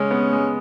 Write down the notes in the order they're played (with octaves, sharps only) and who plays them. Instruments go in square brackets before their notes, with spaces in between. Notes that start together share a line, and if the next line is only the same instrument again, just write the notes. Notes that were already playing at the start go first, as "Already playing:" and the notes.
Already playing: [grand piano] C#3 G#3 [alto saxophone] C#4
[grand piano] B3
G#3